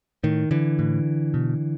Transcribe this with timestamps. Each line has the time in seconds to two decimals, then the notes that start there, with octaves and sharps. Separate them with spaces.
0.23 A2 D#3
0.51 D3 E3
0.79 A2
1.34 B2